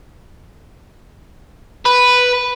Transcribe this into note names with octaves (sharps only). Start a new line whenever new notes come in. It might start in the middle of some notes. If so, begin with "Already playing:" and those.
B4